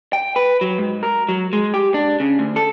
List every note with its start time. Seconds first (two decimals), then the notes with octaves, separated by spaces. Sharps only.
0.13 G5
0.36 B4
0.61 F#3
0.78 G#2
1.03 A#4
1.29 F#3
1.53 G#3
1.74 G4
1.94 D4
2.20 C#3
2.39 D2
2.56 A4